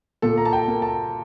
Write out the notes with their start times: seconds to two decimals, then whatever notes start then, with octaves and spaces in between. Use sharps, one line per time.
0.22 A#2 A4
0.38 A#5
0.45 A5
0.53 G5
0.68 A#3
0.82 A5